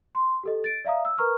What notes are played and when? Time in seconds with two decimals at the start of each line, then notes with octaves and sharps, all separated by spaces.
0.15 C6
0.43 G4 A4 D#5
0.64 A6 D7
0.84 D5 E5 F5 A#5 D#6
1.05 E6
1.18 A#4 B4 A#5 C#6 F6